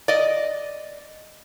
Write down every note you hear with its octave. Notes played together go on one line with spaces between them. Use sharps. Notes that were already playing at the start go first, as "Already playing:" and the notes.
D5 D#5